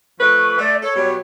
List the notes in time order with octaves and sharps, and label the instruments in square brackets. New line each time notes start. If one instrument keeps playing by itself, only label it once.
[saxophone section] F3 A3 B4 [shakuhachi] C#6
[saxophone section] A3 [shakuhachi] D5
[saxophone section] A4 [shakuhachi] C#5
[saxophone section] B2 F#3 G3